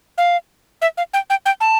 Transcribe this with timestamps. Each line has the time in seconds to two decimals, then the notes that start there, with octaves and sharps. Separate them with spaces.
0.18 F5
0.82 E5
0.97 F5
1.14 G5
1.30 G5
1.46 G5
1.60 A5